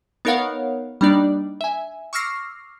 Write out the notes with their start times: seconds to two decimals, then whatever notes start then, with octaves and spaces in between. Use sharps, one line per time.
0.25 B3 D#4 A#4 C#5 F5 F#5
1.01 G3 A#3 D4 D#4 D5
1.61 E5 G#5
2.13 C#6 D6 E6 F6 A#6 C7